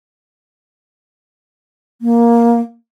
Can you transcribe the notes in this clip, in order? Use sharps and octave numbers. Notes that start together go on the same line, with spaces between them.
A#3